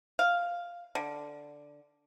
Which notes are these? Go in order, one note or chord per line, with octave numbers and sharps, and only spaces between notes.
F5
D3